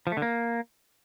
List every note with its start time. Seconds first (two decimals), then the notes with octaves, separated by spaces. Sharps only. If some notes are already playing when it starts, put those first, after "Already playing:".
0.07 F3
0.12 A3
0.17 D3
0.22 A#3